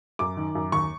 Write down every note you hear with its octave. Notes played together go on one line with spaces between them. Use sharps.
F#2 D6
D#3
F#2
D#2 C#6